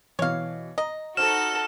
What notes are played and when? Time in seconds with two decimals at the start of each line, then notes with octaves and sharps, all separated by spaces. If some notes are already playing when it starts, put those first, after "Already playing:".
0.19 B2 E3 C#5 F5
0.78 D#5 A#5
1.17 D#4 F#4 A4 C5 F6 E7